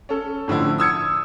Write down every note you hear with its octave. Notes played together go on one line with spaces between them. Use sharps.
C#4 A4
A2 D3 F3 E4
D#6 E6 G#6 C#7